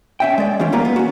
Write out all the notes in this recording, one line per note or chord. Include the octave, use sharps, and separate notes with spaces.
C#4 E5 G5
G#3 D5
E3 G3 C#4 F4
E2 E3 A#3 B3 F4 A#5
B3
C#4 F#4